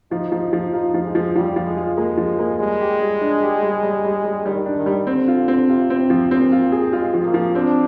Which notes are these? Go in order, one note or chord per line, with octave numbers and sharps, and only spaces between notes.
F3 D#4
F3
F3
D#4 F4
F3
G#3
F3
F3 G3
F3
G#3
F4
G#3 A#3
F3
A#3
G3 G#3
G4
G3
D4
G4
G3
G3
G3
G3
D#3 G3
D4
D#3
G3
D3 C4
F4
C4
C3 F4
C4
F3
A#2 C4
F4
G#4
G#3 F4
F3
A#3
F3
C4 D4